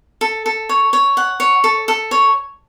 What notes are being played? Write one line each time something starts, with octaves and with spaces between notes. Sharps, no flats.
A4
A4
C#5
C#5
F#5
C#5
A4
A4
C#5